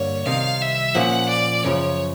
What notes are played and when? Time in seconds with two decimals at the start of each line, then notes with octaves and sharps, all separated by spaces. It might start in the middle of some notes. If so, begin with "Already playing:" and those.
Already playing: G2 D3 G3 A#3 C#5
0.26 C2 C3 D#3 F5
0.61 E5
0.95 A#2 F3 A#3 C#4 F#5
1.29 D5
1.63 F#2 C#3 F3 C#5